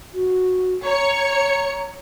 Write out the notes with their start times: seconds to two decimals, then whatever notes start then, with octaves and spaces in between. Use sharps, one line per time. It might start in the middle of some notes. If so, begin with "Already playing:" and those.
0.14 F#4
0.86 C#5 A#5 C#7